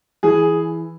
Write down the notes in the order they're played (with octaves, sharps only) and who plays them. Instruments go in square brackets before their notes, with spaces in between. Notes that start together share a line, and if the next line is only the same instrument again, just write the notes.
[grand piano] E3 G#4